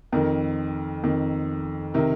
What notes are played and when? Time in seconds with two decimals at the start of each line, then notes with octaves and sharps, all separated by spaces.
0.12 F2 D#3 A#4
1.03 F2 D#3
1.94 C3 D#3 A#4